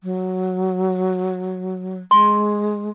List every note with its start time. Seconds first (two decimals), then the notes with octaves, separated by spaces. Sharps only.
0.03 F#3
2.11 G#3 C6